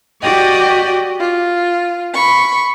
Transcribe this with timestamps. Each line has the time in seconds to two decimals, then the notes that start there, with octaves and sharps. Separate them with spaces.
0.23 F#4 G4 D5 D#5 G5
1.20 F4
2.14 B5 C#6